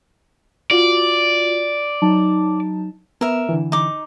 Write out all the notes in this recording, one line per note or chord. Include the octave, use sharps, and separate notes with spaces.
F4 F#4 D5
F#3 D#4 A5
B3 A#4 E5
D3 E3
D#4 D6